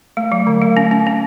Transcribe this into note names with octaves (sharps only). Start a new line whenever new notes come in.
A3
F#3
D3
A3
C#4
C#4
C#4